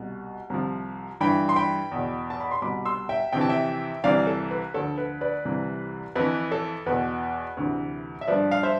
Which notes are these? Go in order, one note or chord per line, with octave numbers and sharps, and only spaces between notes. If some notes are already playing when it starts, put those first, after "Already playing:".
Already playing: C2 B2
C2 C3 F3
G2 E3 G5 B5
C6
G5 B5
E2 B2
A5
B5
C6
C2 B2 B5 D6
C6 E6
E5 G5
F2 C3 E3 G5
A5
E5 G5
C2 C3 E3 D5 F5
A4
B4
D2 D3 F3 A4
B4
B4 D5
C2 C3 E3
F2 E3 B4
A4
E2 B2 B4
D2 C3 E3
E5
G2 F3 B4 D5
F5
C5 E5